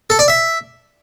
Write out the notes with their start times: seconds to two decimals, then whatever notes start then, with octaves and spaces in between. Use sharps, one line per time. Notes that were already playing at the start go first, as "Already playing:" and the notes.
0.10 A4
0.19 D5
0.28 E5